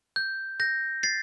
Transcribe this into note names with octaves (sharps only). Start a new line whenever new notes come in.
G6
G6 A#6
A6 C7